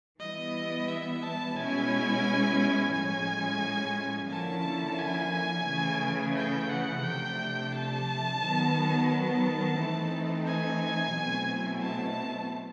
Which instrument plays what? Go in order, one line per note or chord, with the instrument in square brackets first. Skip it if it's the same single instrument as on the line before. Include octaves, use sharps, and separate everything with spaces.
[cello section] E3 G3 B3 E4 [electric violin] D#5
[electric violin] E5
A5
[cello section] B2 G#3 C#4 E4 [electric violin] G#5
[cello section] A2 F3 G#3 C#4 [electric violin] G#5
[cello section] D3 F3 A#3 C#4 E4 [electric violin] A5
[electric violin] G#5
[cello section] C#3 E3 A3
[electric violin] G5
F#5
[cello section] C3 F3 A3 D4 [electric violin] G5
[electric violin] A5
[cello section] D#3 F#3 B3
[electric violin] A5
[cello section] E3 A3 C4 D#4
[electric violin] G#5
[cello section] B2 F#3 A3 C4 E4
[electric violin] A5